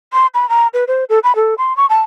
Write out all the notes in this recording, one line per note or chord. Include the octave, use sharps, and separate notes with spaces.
C6
B5
A#5
B4
C5
A4
B5
A4
C6
C#6
A5